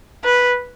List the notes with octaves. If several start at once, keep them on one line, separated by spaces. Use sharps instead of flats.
B4